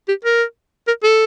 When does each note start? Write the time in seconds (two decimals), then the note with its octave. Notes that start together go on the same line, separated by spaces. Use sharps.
0.08 G4
0.24 A#4
0.87 A#4
1.03 A4